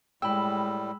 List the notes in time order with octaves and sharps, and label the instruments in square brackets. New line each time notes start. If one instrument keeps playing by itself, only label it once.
[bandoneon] A2 G3 [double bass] G#3 [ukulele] G5 [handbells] B5 E6